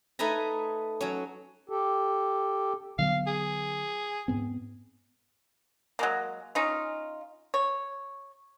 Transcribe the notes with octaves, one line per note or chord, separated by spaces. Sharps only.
A3 D#4 B4 G#5 A#5
F#3 C#4
G4 A4
D3 F#3 B3 F5
G#4
G#2 B3 C4
F#3 G#3 A#3
C#4 D#4 F4
C#5